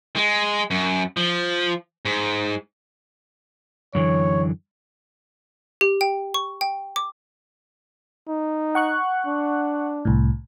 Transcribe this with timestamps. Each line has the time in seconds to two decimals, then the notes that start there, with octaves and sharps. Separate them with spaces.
0.16 G#3
0.71 F#2
1.17 F3
2.05 G#2
3.95 F#2 D3 E3 C#5
5.81 G4
6.01 G5
6.34 C#6
6.61 G5
6.96 D6
8.28 D#4
8.75 F#5 C#6 F#6
9.26 D4
10.05 C2 A2